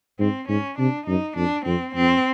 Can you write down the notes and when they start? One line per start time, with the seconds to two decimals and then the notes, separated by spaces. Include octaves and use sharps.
0.19 G#2 C4
0.49 G#2 C#4
0.79 C3 D4
1.07 F#2 D#4
1.36 F2 D4
1.66 F2 C4
1.95 F2 C4